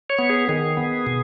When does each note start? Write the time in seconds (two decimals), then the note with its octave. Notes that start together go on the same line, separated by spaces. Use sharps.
0.10 C#5
0.19 B3
0.29 G#4
0.49 D#3 G#4
0.77 B3
1.07 B2